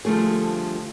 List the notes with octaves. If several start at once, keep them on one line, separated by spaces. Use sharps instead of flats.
D3 F3 G3 A3 G#4